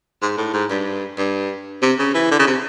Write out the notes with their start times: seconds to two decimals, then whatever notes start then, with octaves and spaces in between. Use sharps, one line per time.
0.22 G#2
0.38 A2
0.53 G#2
0.70 G2
1.18 G2
1.82 C3
1.98 C#3
2.14 E3
2.31 D3
2.39 C#3
2.47 C3